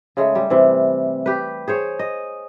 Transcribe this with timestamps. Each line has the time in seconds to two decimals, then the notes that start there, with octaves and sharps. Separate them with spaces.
0.17 C#3 G#3 A3
0.35 G3
0.50 C3 E3
1.26 G4 B4
1.68 G#4 C5 C#5
1.99 D#5